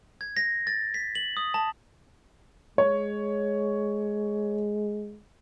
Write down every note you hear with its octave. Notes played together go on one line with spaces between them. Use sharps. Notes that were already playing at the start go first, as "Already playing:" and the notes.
G#6
A#6
A6
B6
F#7
D#6
A5
G#3 C#5